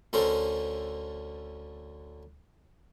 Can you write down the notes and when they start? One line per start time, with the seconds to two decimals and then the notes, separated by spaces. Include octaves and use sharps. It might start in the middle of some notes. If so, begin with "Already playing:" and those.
0.13 D2 D3 C#4 A4 A#4 C5